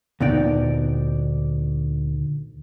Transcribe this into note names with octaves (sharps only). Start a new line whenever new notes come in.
D2 A#2 B3 D#4 D5 G5